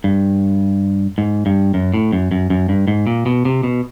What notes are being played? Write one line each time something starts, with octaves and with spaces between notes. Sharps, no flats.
G2
G#2
G2
F#2
A2
F#2
F#2
F#2
G2
G#2
A#2
B2
C3
B2